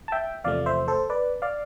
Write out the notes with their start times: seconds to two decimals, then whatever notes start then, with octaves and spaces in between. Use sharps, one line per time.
0.08 A5
0.12 E5 G5
0.44 E2 C3 F3 A3 D5 F5
0.66 C5 E5
0.88 A4 C5
1.10 B4 D5
1.42 D5 F5